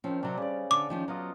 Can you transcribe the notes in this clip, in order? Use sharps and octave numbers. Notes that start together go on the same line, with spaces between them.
D#3 F3 C4 C#4
C3 F#3 D4 D5
C#3 G3 D5
D3 D6
D#3 F3 C#4
B2 F#3 F4 D#5